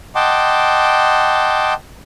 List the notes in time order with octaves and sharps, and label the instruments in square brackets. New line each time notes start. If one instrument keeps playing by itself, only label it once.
[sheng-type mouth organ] D#5 F#5 G5 A5 C6 D6